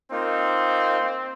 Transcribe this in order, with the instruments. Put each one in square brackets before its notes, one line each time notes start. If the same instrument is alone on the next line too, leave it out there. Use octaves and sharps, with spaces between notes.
[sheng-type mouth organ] A#3 D#4 F4 [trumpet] C4